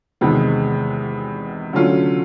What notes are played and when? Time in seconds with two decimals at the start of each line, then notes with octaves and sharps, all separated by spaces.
0.21 E2 C3 D#3 G#3 B3
1.73 D3 F#3 A3 C#4 F4